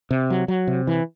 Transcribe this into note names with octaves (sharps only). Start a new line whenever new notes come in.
C3
F#3
F#3
C3
E3